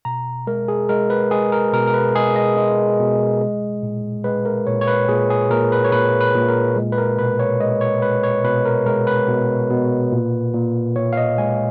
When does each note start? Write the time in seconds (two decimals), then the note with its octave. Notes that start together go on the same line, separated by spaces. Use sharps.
0.05 B2 A#5
0.47 G#3 A#4
0.68 G#4
0.89 G#3 A#4
1.10 B4
1.31 G#3 G#4
1.52 A#4
1.73 B2 A#4
1.87 A#4
1.94 B4
2.15 G#3 G#4
2.36 D#5
2.57 G#3
2.99 B2
3.41 G#3
3.83 A#2
4.24 G#3 B4
4.45 A#4
4.67 A#2 C#5
4.81 C#5
4.88 B4
5.08 A#2 G#4
5.30 G#4
5.50 A#2 A#4
5.72 B4
5.85 C#5
5.92 A#2 B4
6.21 B4
6.35 A#2
6.48 A#4
6.76 G#3
6.92 B4
6.98 A#4
7.18 B2 B4
7.40 C#5
7.60 G#3 D#5
7.81 C#5
8.02 G#3 B4
8.23 C#5
8.44 B2 B4
8.65 A#4
8.86 G#3 A#4
9.07 B4
9.28 B2
9.70 B2
10.12 A#2
10.54 A#2
10.96 A#2 C#5
11.13 F5
11.17 D#5
11.38 G#3 G#5